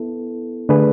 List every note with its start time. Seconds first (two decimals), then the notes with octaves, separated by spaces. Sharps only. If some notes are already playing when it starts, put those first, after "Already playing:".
Already playing: B3 E4 A4
0.69 D3 A3 D4 G#4 B4